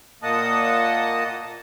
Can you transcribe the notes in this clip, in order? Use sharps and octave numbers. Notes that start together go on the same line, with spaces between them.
A#2 A#3 D#5 F#5 A5 D#6